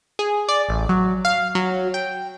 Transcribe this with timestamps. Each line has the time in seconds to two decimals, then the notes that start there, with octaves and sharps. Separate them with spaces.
0.19 G#4
0.49 D5
0.69 A1
0.89 F#3
1.25 F5
1.55 F#3
1.94 G5